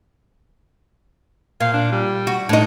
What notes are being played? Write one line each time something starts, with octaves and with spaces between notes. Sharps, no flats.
A#2 F5
D4
G3
F#4
A2 D4 D#4